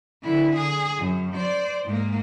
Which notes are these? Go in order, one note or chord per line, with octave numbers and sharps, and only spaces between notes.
D3 E4
G#4
F#2
C5 D5
G#2 A#3